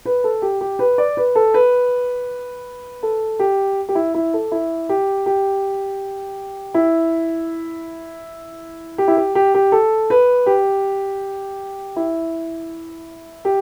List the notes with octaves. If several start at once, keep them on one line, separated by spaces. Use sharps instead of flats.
B4
A4
G4
G4
B4
D5
B4
A4
B4
A4
G4
G4
E4
E4
A4
E4
G4
G4
E4
G4
E4
G4
G4
G4
A4
B4
G4
E4
G4